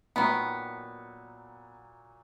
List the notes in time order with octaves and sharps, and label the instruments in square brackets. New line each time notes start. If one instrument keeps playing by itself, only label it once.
[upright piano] A#2 F#3 [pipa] D#3 B3